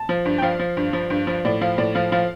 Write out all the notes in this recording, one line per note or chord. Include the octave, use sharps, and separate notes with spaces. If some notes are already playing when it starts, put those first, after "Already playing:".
Already playing: A5
F3
G2
G5
F3 F5
F3
G2
F3
G2
F3
A2 D5
F3 F5
A2 D5
F3 F5
F3 F5